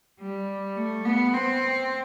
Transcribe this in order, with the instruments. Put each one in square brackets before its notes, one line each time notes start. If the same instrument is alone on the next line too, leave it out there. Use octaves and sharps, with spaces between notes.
[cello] G3
A3
B3
C4